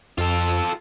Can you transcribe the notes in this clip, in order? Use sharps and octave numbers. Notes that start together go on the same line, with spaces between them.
F2 F4 A4